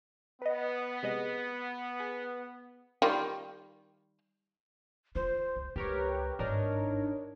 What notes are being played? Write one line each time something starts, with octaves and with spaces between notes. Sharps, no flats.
B3 B4 D#5
C3 G#3 D#5
G#4
D#3 G3 F4
F4 C5
C#2
C#2 G4 A#4 B4 C#5
G#1 G2 D4 D#4 A#4 C#5